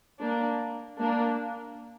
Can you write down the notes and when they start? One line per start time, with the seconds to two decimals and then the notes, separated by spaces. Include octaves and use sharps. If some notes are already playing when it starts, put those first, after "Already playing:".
0.20 A#3 D4
0.99 A#3 D4